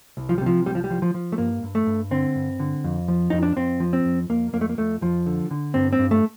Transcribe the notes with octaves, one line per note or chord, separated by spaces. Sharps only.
C2
F3
G3
C3 F3
C2 G3
F3
G3
F3
F3
F3
A3
G2 A#3
G2
A3
G2
D3 C4
G2
D3
F2
F3
F2 D#4
D4
F2 C4
F3
C4
F2
F2 A#3
F2 A#3
A3
A#3
F2 A3
F2 F3
D3
D3
G2 C4
C4
G2
A3